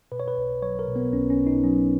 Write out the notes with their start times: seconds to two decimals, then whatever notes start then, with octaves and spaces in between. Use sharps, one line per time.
0.12 B2 B4
0.20 C#5
0.28 B4
0.37 B1
0.62 F#3 C#5
0.79 A#4
0.88 B2
0.96 B3
1.13 B1 C#4
1.30 C#4
1.38 B2
1.47 D#4
1.63 F#3 C#4